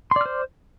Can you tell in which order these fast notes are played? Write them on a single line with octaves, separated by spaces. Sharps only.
C6 D5 F6 C5